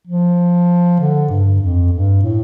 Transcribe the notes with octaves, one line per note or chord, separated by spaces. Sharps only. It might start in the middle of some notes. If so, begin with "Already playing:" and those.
F3
D3
G2
F2
G2
A2